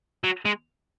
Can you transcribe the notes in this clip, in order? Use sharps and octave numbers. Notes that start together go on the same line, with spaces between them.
F#3
G#3